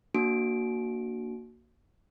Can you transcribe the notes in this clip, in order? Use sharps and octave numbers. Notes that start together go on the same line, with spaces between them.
A#3 D4 F#4 D7